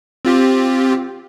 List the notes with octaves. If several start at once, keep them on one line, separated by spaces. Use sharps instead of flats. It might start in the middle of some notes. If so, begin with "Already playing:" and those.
C4 F4 G4